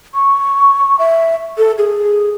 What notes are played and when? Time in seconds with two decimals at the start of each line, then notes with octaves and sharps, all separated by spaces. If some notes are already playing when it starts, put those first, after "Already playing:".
0.14 C#6
0.99 E5
1.58 A4
1.78 G#4